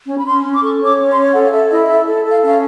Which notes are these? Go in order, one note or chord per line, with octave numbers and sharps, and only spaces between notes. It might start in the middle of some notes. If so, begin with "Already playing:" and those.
C#4
B5
C#4 C6
C#4
D6
A4 C#6
C#5 D6
C#4
C6
C#5
A4 F#5
F5
A4 E5
E4 D#5
A4 E5
A4
A4
F5
C#4 F5